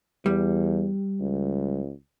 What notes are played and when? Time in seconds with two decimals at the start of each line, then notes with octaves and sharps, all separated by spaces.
0.26 E2 G3
1.20 C#2